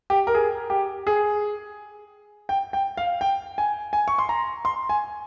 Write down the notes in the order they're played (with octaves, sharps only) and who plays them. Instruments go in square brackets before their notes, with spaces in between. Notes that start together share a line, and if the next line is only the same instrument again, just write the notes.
[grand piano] G4
A#4
G#4
G4
G#4
G5
G5
F5
G5
G#5
G#5
C#6
C6
A#5
C6
G#5